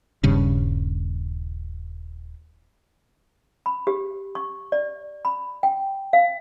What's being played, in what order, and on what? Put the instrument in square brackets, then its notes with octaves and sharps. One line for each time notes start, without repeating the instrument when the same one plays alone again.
[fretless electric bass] D#1 G2 C#3
[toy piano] B5
G4
C#6
D5
B5
G5
F5